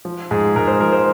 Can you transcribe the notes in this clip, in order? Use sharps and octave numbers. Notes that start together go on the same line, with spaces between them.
F3
G#2 G#4
G#2 A#4
C5
F3 A#4
C5